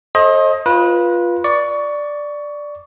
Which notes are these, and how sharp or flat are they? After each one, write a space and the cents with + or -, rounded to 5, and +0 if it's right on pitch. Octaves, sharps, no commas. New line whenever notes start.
A4 +0 C5 +40 D#5 +15
F4 +0 B4 -20
D5 +0 C#6 +20